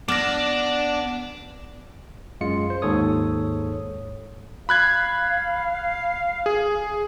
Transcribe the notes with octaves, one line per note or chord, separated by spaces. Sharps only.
B3 D4 D5 D6 F6 A#6
F#2 G#3 F4 C#7
C5
D#2 G#2 A4 C#5 D#6
F5 B5 F#6 G#6
G#4